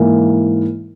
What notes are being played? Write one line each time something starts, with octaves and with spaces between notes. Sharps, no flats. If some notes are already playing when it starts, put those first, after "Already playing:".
Already playing: G#2 E3 A#3 E4